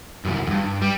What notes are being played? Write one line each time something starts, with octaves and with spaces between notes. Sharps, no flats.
C2 F#2
E2 G2
G3